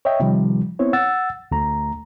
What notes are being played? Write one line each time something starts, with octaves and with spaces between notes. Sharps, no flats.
C#5 D#5 E5 G5
C3 D#3 F3 G3
B3 C4 E4 C#5
F#5 E6 A6
D2 A3 A#5